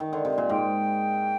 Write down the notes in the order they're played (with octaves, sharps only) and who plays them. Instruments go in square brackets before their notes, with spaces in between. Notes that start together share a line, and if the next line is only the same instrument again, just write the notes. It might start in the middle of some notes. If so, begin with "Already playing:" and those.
[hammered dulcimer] D#3
D3
C3
A#2
[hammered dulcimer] G#2 [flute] G5